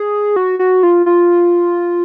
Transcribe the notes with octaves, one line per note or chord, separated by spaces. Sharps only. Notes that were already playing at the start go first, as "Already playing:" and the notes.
Already playing: G#4
F#4
F#4
F4
F4